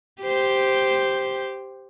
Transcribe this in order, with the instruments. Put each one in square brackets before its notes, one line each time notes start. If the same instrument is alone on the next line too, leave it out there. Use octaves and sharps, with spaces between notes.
[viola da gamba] G4 C5